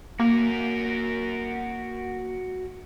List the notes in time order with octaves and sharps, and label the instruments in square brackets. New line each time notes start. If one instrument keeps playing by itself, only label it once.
[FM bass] A#3 [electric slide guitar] F#4 A#4